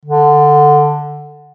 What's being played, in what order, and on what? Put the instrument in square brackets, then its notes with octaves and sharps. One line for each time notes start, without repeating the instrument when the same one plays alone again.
[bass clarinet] D3